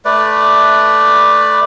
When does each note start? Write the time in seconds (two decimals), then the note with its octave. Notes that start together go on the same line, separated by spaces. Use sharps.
0.05 A3 B4 D5